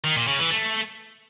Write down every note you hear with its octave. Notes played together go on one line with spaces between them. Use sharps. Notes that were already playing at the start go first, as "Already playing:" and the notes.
D#3
A#2
C#3
E3
A3